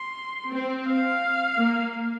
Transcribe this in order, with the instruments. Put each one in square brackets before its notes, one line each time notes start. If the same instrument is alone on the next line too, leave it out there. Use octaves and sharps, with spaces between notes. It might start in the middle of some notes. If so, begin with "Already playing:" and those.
Already playing: [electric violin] C6
[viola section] C4
[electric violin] F5
[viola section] A#3